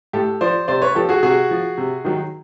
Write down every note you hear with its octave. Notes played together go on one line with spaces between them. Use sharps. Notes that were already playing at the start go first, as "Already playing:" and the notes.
A2 G4 A4
F3 C5 D5
C3 C5 D5
B4 C#5
F3 G4 A4
F#4 G#4
C3 F#4 G#4
F3
C3
D#3 F#3